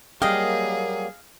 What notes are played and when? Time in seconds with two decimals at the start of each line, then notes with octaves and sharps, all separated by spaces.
0.22 F#3 G3 A#3 G#4 D#5 F5 G5